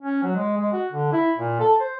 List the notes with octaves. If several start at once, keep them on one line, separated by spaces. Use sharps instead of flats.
C#4
F#3
G#3
G#3
F#4
D3
E4
A#2
A4
C5